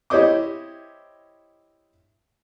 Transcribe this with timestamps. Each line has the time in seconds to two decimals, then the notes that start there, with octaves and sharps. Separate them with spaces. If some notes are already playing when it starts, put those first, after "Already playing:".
0.10 E4 G4 C5 C#5 D#5 D6